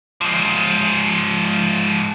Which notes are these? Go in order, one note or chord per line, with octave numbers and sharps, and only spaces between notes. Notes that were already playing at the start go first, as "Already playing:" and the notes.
G#2 F3